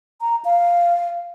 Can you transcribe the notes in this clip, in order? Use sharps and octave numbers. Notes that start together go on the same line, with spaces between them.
A#5
F5